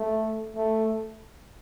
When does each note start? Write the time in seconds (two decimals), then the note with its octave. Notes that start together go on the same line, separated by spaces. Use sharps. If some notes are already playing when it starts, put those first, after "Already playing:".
Already playing: A3
0.56 A3